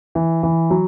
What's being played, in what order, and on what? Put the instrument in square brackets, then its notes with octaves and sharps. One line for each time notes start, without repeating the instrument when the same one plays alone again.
[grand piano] E3
E3
F#3